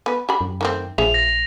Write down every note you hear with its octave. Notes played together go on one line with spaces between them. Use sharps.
B3 B4
G4 B5
F#2
D#3 A3 C4
A#1 F3 G#4 E5 F7
A#6